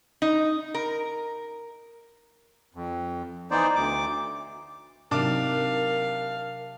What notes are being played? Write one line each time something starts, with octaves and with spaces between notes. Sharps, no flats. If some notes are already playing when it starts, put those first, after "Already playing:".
D#4
A#4
F2
E3 B3 D#4 C5 D5
D2 D6
C3 F#3 D4 D#4 A#4 F5 A5 D6